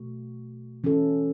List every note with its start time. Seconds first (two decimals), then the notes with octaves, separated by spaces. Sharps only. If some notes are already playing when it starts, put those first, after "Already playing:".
Already playing: B2 A3 F#4
0.84 E3 C#4 F#4 A4